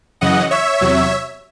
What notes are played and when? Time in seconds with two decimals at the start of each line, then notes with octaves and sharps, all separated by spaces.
0.21 F#2 C#3 E3 D#5 F#5
0.51 C#5 E5
0.81 E2 C3 F#3